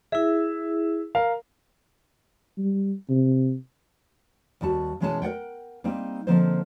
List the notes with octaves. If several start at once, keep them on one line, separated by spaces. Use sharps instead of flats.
E4 G#4 E5
A#4 F5
G3
C3
D#2 G3 F#4 A5
B2 E3 G#3 C#4 G#4 A5
A#4 D5 F#5 G5
G3 A#3 C4 D#4
D3 F3 A#3 C4 D#4 C5